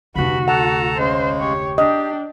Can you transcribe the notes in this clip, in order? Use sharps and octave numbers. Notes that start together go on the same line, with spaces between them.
F1 D2 G2 F#4 B5
A4 F#5 A5 A#5
C#3 G#3 C5
G4 C#5
D4 G4 D#5 G5